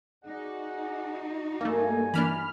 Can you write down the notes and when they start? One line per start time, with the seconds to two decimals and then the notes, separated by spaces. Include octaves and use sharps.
0.25 D#4 F#4 G#4 D5 F#5
1.61 G2 A3 A#3 G#5
2.14 E3 A#3 D4 B5 F6